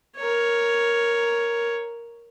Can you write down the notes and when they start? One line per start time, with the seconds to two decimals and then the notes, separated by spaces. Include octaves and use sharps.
0.17 A#4 C#5